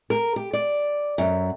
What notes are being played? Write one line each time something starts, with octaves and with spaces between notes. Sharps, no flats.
A#4
G4
D5
F#2